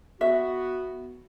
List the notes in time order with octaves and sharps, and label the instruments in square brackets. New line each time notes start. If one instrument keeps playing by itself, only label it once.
[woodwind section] B3 F#4 [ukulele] E5